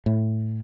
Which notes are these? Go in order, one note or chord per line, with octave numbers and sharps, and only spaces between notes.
A2